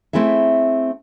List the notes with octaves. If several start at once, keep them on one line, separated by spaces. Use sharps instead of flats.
A3 C4 E4 G#4 E5